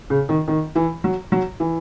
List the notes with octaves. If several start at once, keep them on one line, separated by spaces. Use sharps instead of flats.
C#3
D#3
D#3
E3
F#3
F#3
E3